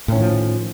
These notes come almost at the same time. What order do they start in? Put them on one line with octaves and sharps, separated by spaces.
A2 C#4 D#3 F3